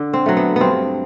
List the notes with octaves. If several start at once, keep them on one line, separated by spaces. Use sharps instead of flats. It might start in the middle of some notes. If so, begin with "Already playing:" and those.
Already playing: D3 D4
C4
F#3 A3
B3
G2 B3 C4